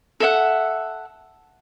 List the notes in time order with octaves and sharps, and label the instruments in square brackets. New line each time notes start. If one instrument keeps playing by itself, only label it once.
[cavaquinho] A4 E5 F#5